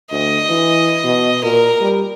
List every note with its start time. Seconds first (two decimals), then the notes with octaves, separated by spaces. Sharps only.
0.12 D2 D#5
0.49 E3
1.04 B2
1.44 A#2 A#4
1.81 G3